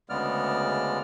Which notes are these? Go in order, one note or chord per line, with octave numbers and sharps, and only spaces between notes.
D2 C#3 G#3 B3 D5 F6